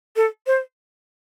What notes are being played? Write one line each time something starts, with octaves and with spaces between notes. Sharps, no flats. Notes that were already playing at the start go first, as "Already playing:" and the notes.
A4
C5